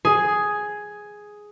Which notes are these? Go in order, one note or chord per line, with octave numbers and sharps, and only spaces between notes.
G#4